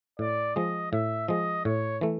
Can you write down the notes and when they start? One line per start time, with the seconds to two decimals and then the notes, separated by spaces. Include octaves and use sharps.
0.19 A2 D5
0.55 F3 G#3 D#5
0.92 A2 E5
1.28 F3 G#3 D#5
1.65 A2 C#5
2.01 E3 A3